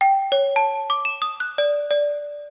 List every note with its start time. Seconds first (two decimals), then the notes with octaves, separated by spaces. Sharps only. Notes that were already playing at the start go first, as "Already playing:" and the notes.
0.01 G5
0.32 C#5
0.56 A5
0.90 D6
1.05 E7
1.22 D#6
1.40 F#6
1.58 D5
1.91 D5